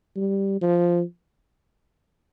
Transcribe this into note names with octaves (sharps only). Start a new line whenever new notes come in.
G3
F3